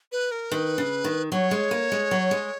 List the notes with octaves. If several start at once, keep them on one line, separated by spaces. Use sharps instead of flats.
B4
A#4
D#3 B4
C#3
D#3
F#3 C#5
G#3
A#3
G#3
F#3
G#3